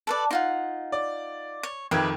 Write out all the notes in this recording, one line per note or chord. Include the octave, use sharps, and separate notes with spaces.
A4 B4 D5
D#4 F4 F#5
D5
C#5
F2 D#3 G4 B4 E5 G#6